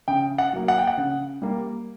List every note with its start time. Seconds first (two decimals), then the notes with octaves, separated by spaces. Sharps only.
0.08 C#3 G5
0.38 F#5
0.53 F#3 A#3
0.68 F#5
0.78 G5
0.87 F#5
0.98 C#3
1.42 G3 A#3